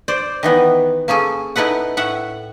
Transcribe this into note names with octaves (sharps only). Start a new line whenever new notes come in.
C5 D5
D#3 E3 B3
A#3 C#4 G#4 A4
D#4 E4 A4 B4 F#5
A2 E5 F#5